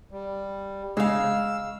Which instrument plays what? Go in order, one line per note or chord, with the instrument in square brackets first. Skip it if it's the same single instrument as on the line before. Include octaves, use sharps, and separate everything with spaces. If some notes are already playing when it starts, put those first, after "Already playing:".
[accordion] G3
[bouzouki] C#3 F5 [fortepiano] G#3 [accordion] E6